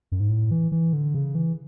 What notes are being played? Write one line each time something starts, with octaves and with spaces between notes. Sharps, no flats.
F#2
G#2
A2
E3
E3
D3
C#3
E3